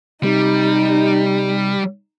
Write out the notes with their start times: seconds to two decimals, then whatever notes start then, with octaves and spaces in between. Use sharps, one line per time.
0.23 C3 G3 D#4 G4